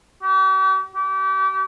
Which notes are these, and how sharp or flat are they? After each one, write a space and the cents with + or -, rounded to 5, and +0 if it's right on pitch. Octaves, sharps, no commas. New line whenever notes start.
G4 -45
G4 -35